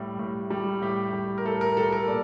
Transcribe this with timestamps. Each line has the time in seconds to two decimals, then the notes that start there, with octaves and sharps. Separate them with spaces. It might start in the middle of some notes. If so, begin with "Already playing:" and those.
Already playing: A2 G3
0.19 A2
0.50 G3
0.82 A2 G4
1.13 G3
1.38 A#4
1.45 A2 A4
1.61 A#4
1.77 G3 A4
1.92 A#4
2.08 A#2 D5